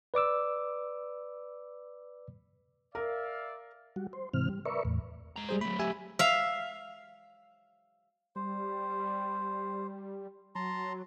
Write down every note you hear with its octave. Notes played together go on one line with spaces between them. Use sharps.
B4 D5 D6 E6
A#4 D5 E5 F5
G3 F#4
C5
G#2 C3 E3 C4 F6
G3
A#4 B4 D5 E5 C#6
E2 A2
G#3 A#5
G3 G#4 C5
F#3 A3 B5
G4 E5 G#5
E5 F5
G3 C5
F#3 A5 A#5 C6